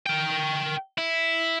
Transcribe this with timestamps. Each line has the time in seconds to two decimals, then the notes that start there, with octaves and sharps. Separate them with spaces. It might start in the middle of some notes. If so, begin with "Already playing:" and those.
0.06 A#4 G5
0.98 E4